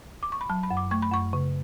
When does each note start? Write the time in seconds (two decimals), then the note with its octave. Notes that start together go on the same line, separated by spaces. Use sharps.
0.23 D6
0.32 C#6
0.41 B5
0.49 F#3 A5
0.63 B5
0.70 F#2
0.77 D6
0.91 A3 C#6
1.02 B5
1.12 F#2 C#6
1.33 C#3